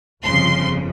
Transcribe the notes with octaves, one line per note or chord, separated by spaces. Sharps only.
G1 F2 C#3 F3 C6